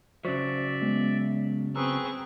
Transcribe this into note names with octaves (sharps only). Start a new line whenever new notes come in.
C#3 F#3 C5 D5 E5 C#6
G#3 B3
C4 G#4 B4 A#5 C#6 E6